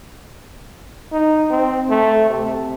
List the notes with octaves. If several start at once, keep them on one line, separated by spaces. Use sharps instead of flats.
D#4
C4
A3
C3